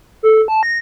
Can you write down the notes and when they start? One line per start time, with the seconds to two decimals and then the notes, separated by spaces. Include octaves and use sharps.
0.23 A4
0.48 A5
0.63 A#6